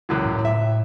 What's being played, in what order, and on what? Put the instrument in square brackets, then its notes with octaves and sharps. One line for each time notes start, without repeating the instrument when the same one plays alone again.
[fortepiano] C#2 F#2 E3
[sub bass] A2
[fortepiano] E5